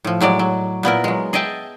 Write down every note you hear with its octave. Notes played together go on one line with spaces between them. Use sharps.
A2 F3
A2 F#3 G#3 D5
F#3
A#2 B3 E4 A#4
F#3 G#3
G#4 D#5 E5 G5 A5